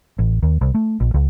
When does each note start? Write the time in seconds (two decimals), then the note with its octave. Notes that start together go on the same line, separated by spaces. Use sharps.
0.19 A1
0.43 D#2
0.61 C2
0.74 A3
1.00 A#1
1.14 C#2